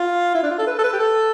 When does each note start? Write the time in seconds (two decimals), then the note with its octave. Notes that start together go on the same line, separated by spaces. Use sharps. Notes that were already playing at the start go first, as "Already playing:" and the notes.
Already playing: F4
0.35 E4
0.43 D4
0.51 F4
0.59 A4
0.67 B4
0.79 A4
0.84 B4
0.93 G4
1.00 A4